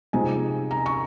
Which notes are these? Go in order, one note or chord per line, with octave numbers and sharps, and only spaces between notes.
C3 F3 G#3 C4 D#4 G#5
A#5
C#6